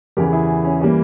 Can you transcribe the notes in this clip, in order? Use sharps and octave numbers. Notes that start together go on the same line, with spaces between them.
E2 C#3 E3 G4 A#4
E4 G#4
C#4
E3 G3 A#3 C#4